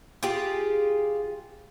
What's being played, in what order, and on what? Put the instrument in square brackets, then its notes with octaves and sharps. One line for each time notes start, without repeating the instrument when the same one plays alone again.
[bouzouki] F4 G4 G#4